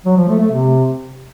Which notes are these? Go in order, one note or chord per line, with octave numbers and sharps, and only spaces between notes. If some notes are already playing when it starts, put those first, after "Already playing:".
F#3
F3
A3
A3
C3